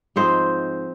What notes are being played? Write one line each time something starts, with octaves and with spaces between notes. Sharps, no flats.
G#2 F3 C4 D#4 C5